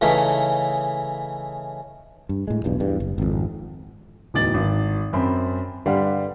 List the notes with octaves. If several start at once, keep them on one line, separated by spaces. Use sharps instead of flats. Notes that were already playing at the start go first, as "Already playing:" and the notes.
C#3 E3 A3 C#4 D#4
G2
A2 G#3
B1 E2 G2
E2 G2
F#1
G#1 F2
D1 E2 D#4 D6 A6 F#7
G#1
F#2 C4 B5
G2 D3 G3 G4 F5 F#5